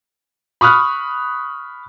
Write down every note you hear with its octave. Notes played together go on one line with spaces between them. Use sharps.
B5 C#6 D#6 F6 F#6